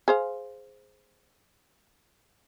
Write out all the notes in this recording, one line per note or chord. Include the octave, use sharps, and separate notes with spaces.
G#4 C5 F5